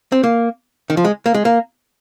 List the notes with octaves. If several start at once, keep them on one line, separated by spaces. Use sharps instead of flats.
C4
A#3
D#3
F3
G#3
A#3
G#3
A#3